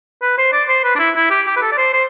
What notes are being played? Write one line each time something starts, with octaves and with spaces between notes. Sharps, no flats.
B4
C5
D5
C5
B4
D4
E4
E4
G4
G4
B4
A4
D5
C5
C5